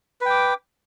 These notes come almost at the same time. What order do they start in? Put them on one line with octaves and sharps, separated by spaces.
B4 G5 D6